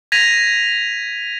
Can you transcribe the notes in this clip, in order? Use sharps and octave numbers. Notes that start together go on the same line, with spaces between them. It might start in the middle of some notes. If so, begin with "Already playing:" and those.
G#6 A#6 B6 D#7 F7